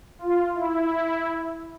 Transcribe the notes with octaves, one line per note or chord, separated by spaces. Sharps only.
F4
E4